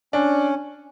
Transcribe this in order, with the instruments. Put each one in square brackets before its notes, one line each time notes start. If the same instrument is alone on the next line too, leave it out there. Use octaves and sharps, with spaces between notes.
[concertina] C#4 [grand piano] D4